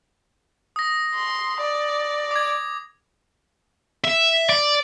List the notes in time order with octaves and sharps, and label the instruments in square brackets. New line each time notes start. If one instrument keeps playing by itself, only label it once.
[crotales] D#6 A#6
[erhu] C6
D5
[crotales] D6 G#6
[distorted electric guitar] E5
D5